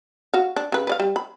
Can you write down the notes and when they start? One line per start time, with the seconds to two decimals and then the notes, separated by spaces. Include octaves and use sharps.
0.34 F#4 F5
0.56 D4
0.72 C#3 B4
0.87 B4 D5 F5
1.00 G3
1.16 B5